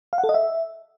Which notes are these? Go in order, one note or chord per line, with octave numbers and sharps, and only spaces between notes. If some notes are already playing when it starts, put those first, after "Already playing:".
F5
F#5
A4
D#5
E5